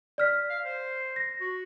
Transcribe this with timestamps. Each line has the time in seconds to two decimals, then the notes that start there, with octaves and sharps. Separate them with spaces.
0.18 D5 F6 B6
0.49 F5
0.64 C5
1.16 A#6
1.40 F#4